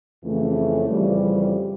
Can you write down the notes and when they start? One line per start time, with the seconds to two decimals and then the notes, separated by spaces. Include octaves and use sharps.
0.23 F2 C#3 E3 A3 C#4
0.89 F2 C#3 E3 G3